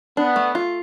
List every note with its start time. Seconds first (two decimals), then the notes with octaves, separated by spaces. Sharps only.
0.17 B3 D4
0.36 A3
0.55 F4